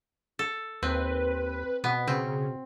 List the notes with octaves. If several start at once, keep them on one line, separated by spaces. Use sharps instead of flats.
A4
D#2 C4 B4
B2 B3
C#3 C4